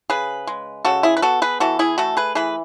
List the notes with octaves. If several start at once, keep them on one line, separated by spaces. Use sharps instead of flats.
C#3 G#4 B4
G#3
C#3 F#4 A4
E4 G#4
B4
B3 F#4 A4
G#4 B4
E3 F#4 A4
E4 G#4
A3 F#4 A4
G#4 B4
E3 G#4 B4